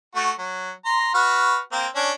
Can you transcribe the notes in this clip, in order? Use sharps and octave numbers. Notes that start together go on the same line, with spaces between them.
A3 F#4
F#3
A#5 C6
F#4 B4 F6
A#3 C4
C#4 D4